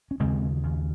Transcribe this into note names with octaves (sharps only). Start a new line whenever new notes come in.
C#4
D#2 C#3 G#3 C4
D#2 C#3